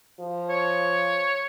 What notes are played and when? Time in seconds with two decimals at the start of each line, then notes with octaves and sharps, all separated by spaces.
0.20 F3
0.49 C#5